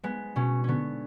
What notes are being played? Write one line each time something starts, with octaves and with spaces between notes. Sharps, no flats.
G#3 B3
B2 C#4
D3 B3 C#4